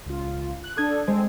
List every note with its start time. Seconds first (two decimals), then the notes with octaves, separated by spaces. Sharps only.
0.06 C#2 F4
0.64 F#6
0.77 D4 A4 D#6 G#6
1.07 G#3 C4 A4 C5